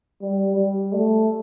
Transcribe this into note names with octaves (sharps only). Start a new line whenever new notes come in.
G3
G3
A3